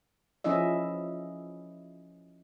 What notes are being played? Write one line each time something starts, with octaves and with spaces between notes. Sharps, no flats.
F3 C#4 E4 D#5 E5